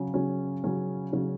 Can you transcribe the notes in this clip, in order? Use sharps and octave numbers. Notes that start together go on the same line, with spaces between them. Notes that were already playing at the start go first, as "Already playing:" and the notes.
Already playing: C#3 F#3 C#4
C#3 F#3 C#4
C#3 F#3 C#4
C#3 F#3 C#4